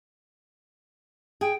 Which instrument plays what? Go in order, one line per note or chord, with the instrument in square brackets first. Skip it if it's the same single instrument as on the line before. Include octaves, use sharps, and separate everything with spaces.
[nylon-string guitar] G#4 [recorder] G5